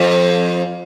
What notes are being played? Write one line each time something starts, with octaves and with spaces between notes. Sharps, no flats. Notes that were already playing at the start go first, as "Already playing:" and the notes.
Already playing: F2